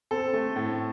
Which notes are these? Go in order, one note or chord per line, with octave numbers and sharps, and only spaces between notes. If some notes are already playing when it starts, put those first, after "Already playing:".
C4 A4
A3
A2